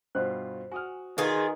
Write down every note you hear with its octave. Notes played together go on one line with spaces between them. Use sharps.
G2 B2 F4 C5
F#4 G#5 D#6 F6
D#3 F4 G#4 B4 D5 F#5